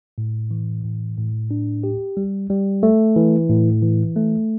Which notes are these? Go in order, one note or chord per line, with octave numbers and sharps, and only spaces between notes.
A2
E3
A2
A2
D4
G4
G3
G3
A3
E3
A2
E3
A3